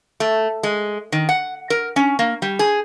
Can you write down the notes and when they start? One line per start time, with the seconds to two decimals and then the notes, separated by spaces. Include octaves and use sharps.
0.20 A3
0.63 G#3
1.12 D#3
1.29 F#5
1.70 A#4
1.96 C#4
2.19 A#3
2.42 G3
2.59 G#4